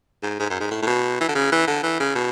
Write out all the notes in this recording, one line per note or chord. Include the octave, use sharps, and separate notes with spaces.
G#2
G#2
F#2
G#2
A2
A2
B2
E3
D3
C#3
E3
D3
E3
C#3
B2